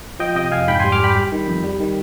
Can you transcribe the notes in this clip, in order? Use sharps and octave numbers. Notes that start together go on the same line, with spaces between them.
F3 D#5 G5
C3 D#5 G5
F2 F5 G#5
G#2 G5 B5
G3 G#5 C6
D6 F6
G3 G5 B5
G3
D#3
F2
G3
D#3